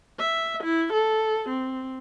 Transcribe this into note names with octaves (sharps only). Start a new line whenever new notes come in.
E5
E4
A4
C4